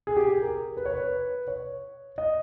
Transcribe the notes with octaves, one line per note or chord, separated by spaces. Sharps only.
G#4
G4
G#4
A#4
B4
C#5
B4
C#5
D#5